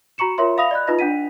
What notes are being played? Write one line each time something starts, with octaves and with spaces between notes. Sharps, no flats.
F#4 A#5 C#6 C#7 E7
F4 A#4 C#5 E5 C6
E5 F5 B5 D#6 A#6 F7
D5 D#5 B5 F#6
D#4 F4 B4 D#5 A#6
D4 F#5 B6 D#7